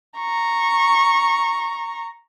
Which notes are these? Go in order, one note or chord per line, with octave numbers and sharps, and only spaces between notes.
A#5 C#6